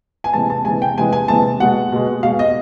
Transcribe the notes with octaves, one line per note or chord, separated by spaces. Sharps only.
G#5
C3 E3 G#3 A5
A5
C3 E3 G#3 G#5
G5
C3 E3 G#3 G#5
G#5
C3 E3 G#3 A5
B2 G#3 F#5
B2 G#3
B2 G#3 F5
D#5